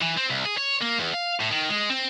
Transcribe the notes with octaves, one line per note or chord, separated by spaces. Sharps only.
E3
C4
C2
G#4
C#5
A#3
E2
F5
A2
D#3
G#3
C4